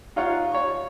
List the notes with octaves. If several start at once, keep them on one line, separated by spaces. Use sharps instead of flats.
D#4 F4 C#5 F#5
C#5 C#6